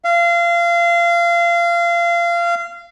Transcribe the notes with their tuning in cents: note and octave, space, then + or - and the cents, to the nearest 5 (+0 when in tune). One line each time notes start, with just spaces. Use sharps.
F5 -25